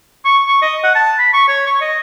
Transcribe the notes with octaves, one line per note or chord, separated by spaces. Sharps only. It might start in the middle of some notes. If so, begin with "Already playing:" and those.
C#6
C#6
D#5
F#5
A5
B5
C#6
C#5
C#6
D#5